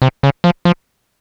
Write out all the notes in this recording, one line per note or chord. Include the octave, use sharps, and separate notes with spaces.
C3
C#3
F3
F3